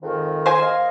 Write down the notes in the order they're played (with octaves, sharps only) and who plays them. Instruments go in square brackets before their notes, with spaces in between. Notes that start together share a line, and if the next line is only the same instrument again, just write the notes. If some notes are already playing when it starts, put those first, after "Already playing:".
[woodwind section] F2 G#2 D#3
[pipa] C5 G#5
[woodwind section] A#3 D#5 F5